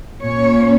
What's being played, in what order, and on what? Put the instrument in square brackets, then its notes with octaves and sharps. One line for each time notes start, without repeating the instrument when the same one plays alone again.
[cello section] A#2 A#3 C#4 C#5